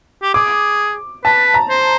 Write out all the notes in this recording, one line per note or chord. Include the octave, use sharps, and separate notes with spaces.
G4
G#4 D6
B4 A5
A#5
C5